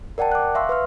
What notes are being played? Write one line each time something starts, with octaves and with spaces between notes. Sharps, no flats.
A#4 D5 F#5 G5 A5
D6 F#6
E5 F5 C6 C#6 E6
B4 C6 F6